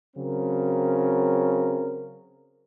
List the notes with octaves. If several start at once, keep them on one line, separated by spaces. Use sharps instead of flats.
C#3 F#3 C4 A#4